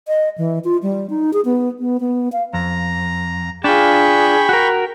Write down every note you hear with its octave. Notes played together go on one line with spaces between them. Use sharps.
D#5
E3
F4
G3
D#4
G#4
B3
B3
B3
F5
F2 A#5
D4 F4 G#4 G5 B5 C#6
F#4 A#4